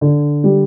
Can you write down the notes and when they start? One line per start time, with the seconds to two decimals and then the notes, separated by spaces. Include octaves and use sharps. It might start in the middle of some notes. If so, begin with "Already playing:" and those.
0.01 D3
0.44 G3